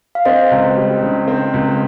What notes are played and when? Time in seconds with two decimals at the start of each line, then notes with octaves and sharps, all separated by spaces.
0.15 F5
0.25 C4 C5 D#5
0.51 C#2
0.77 G3
1.03 C#3
1.28 C4
1.54 C#2